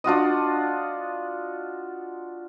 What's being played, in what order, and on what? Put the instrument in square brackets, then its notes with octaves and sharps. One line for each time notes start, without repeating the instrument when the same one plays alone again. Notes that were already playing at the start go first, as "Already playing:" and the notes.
[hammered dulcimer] D4 F4 F#4 D#5